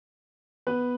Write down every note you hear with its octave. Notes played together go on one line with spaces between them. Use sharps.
B3 B4